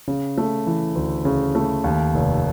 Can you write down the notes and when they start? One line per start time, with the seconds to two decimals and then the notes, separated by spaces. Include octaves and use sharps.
0.07 C#3
0.37 A3
0.66 E3
0.95 D2
1.25 C#3
1.55 A3
1.84 D#2
2.14 F1